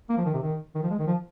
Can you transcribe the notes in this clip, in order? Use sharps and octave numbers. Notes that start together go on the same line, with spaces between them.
A#3
F3
D#3
C3
D#3
D#3
F3
G#3
D#3
F3